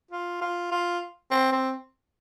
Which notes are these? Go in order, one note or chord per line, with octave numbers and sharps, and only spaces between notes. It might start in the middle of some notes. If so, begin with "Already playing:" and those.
F4
F4
F4
C4
C4